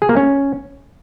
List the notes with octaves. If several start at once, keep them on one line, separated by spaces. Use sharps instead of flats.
G#4
A#3
C#4